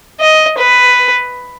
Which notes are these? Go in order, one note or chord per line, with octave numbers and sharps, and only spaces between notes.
D#5
B4